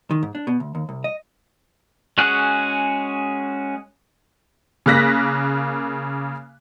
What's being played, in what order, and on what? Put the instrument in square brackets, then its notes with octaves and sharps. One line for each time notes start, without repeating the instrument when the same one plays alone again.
[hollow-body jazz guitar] D#3
G#2
D4
B2
D2
D#2
C2
D#5
[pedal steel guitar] G#3 C#4 F#4 G#4 F#6
[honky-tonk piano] C#3 A#3 F#6 A#6 B6